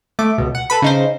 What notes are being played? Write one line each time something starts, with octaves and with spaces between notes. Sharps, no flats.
A3 D6
C#2 B2
F#5
A4 B4 B5
C#3 D#4 C5